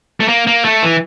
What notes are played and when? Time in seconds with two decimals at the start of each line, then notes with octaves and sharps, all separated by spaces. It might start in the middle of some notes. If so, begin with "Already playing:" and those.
0.20 A3
0.28 A#3
0.47 A#3
0.65 A3
0.83 E3